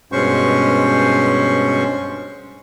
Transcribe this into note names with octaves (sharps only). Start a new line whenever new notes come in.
G2 B2 G#3 C#4 C5 C#6